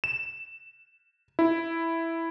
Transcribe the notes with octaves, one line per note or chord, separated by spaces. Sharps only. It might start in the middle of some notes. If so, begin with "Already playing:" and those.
E7
E4